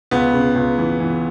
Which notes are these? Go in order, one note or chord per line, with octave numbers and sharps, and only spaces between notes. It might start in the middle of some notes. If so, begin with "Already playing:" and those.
C#2 B3
C#3
C#2
E3
E3